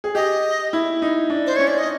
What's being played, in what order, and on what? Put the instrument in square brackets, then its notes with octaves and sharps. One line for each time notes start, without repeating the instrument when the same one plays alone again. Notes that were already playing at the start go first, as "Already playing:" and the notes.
[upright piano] G#4
[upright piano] G4 [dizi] D#5
[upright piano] E4
D#4
D4
[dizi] C5
[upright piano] C#4 [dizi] C#5
[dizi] D5
D#5